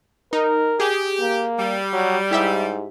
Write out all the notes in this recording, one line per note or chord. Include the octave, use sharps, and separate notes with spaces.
D#4 A#4
G4 G#4
A#3
G3
F#3
G#2 E4 G4 E5